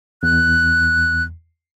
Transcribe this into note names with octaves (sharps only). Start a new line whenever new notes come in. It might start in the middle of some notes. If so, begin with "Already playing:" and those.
E2 F#6